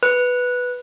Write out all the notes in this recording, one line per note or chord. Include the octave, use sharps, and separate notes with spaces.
B4